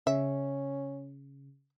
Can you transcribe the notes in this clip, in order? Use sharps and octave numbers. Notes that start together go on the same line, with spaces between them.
C#3 C#4 E5